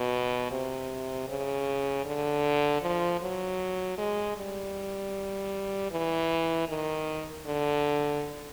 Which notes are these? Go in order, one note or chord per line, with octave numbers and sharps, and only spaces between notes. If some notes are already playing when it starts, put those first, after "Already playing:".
Already playing: B2
C3
C#3
D3
F3
F#3
G#3
G3
E3
D#3
D3